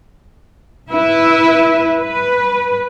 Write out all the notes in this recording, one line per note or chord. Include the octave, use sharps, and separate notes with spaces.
E4 B4 E5
B4